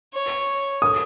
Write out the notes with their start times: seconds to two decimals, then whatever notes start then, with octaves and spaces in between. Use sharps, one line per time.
0.13 C#5
0.82 D#6